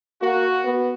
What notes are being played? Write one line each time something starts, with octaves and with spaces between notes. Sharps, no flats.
A#3 F#4
B3